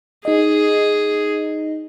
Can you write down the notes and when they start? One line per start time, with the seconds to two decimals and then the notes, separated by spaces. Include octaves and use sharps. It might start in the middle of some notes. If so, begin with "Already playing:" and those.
0.25 D#4 G#4 D#5